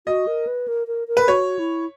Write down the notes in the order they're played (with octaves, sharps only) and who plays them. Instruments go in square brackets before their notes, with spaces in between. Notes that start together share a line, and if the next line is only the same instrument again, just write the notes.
[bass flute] F#4 [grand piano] D#5
[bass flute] A#4
B4
A#4
A#4
A#4
[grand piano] B4
[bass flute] F#4 [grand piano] C#5
[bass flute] E4